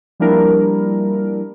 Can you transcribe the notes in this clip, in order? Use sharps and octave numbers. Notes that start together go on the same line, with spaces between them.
F3 G3 A#3 D4 E4 A#4